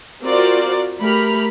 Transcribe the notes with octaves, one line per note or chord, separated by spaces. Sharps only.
C4 F4 F#4 A#4 C5 D5
A3 G4 A#4 B5 F6